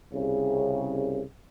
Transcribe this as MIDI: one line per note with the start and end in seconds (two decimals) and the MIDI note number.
0.13 1.22 36
0.13 1.22 49